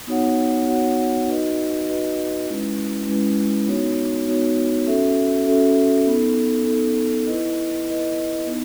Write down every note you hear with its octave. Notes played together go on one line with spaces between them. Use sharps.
B3 D#4 F#4 C#5 F#5
B3 D#4 F#4 C#5 F#5
D#4 F#4 B4 D#5
D#4 F#4 B4 D#5
G#3 C#4 E4 B4
G#3 C#4 E4 B4
B3 D#4 F#4 C#5
B3 D#4 F#4 C#5
C#4 F#4 A4 E5
C#4 F#4 A4 E5
B3 D#4 A4
B3 D#4 A4
E4 B4 D#5
E4 B4 D#5
B3 D#4